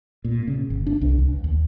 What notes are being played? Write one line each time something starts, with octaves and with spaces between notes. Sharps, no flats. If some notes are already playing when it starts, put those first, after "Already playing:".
A#2
C#3
G1
D4
C2
C#2
D#2